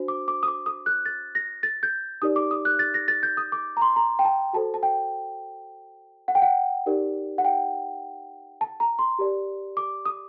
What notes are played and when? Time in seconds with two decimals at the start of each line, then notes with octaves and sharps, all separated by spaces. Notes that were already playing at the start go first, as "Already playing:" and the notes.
Already playing: D4 F#4 C5
0.08 D6
0.28 D6
0.43 D#6
0.48 D6
0.66 D#6
0.86 F#6
1.06 A6
1.35 A#6
1.63 A6
1.83 G6
2.22 D#4 G4 A#4 D5 D#6
2.36 D6
2.51 D#6
2.65 F#6
2.79 A6
2.94 A#6
3.08 A6
3.23 G6
3.37 D#6
3.52 D6
3.77 A#5
3.82 C6
3.96 A#5
4.19 G5
4.25 A5
4.53 F#4 A4 C5 A5
4.74 A5
4.83 G5
6.28 F#5
6.35 G5
6.42 F#5
6.86 D#4 G4 A#4 D5
7.38 F#5
7.45 G5
8.61 A5
8.80 A#5
8.99 C6
9.19 G4 A#4 D5
9.77 D6
10.06 D#6